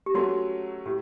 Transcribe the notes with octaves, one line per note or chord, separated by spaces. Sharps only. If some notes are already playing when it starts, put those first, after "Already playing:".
G4
F#3 A3 C#4 F#4
A2 G4